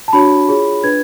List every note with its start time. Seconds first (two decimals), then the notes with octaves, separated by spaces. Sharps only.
0.08 A5
0.13 D4 F#4 C#5 B5
0.49 F4 G#4 C#5
0.83 D4 F4 B4 G#6